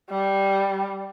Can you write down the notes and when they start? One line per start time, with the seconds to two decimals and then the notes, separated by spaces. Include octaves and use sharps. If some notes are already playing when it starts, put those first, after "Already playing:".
0.11 G3